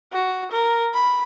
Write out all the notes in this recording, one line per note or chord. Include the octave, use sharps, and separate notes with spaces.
F#4
A#4
B5